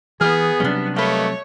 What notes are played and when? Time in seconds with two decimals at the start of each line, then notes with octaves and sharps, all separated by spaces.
0.21 E3 B3 G#4 F6
0.60 C3 F#3 G3 C#4 D4
0.96 A3 A#3 B4 C#5 D#5